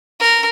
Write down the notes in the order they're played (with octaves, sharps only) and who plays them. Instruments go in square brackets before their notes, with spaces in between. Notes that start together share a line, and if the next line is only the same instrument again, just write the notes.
[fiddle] A#4